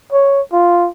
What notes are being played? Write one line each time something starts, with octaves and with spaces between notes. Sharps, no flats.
C#5
F4